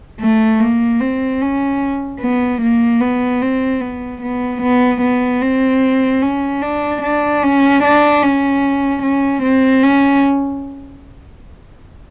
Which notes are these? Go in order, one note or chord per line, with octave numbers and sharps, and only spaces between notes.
A3
A#3
C4
C#4
B3
A#3
B3
C4
B3
B3
B3
B3
C4
C#4
D4
D4
C#4
D4
C#4
C#4
C4
C#4